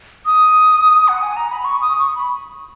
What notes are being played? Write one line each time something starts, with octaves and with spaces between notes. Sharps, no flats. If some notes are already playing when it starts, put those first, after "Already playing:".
D#6
F#5
G#5
A#5
B5
C#6
D#6
C#6
B5